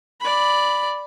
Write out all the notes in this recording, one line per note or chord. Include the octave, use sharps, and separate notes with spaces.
D5 B5